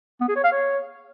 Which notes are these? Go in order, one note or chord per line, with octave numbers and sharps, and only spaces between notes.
B3
G#4
C#5
F5
C#5